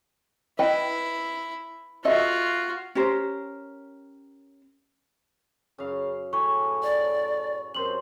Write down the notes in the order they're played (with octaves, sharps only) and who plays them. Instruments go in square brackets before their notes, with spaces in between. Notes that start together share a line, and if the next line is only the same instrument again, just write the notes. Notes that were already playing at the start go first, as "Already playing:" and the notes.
[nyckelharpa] E4 [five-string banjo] B4 D#5 G5
[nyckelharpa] F4 F#4 [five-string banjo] A4 D#5 E5
[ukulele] C#4 G4 A#4 C5
[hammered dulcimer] F#2 F5 [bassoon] C#3
[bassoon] A2 [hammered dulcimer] G#4 B4 C#5 [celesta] C#6
[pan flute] D5
[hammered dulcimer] F#2 C3 C5 [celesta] A#4 C6 F#7